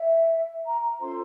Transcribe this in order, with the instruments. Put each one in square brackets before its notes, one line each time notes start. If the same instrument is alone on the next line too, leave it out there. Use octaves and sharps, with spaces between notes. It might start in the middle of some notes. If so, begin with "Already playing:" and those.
Already playing: [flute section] E5
A#5
A#5
C#4 F4 A4 C5 C6